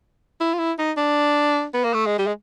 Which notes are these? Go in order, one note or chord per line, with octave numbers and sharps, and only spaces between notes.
E4
F4
E4
D#4
D4
B3
A#3
A3
G#3
G3
G#3